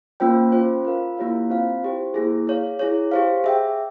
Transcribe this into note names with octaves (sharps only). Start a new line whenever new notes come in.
A#3 C#4 F4 C5 G5
C#4 F4 C5
F4 A#4 F5
A#3 E4 G4 C#5 F5
C4 F4 C5 F5
E4 G4 C5
A#3 E4 G#4
G#4 C#5 F5
E4 G#4 C#5
G4 C5 F5
G#4 E5 G5